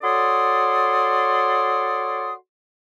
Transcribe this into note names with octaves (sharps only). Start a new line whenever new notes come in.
F#4 A4 C#5 D5 C6 D#6